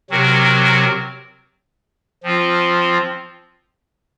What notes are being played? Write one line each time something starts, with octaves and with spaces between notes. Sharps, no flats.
C3 F#3 C4 F#4 A#4
F3 C4 F4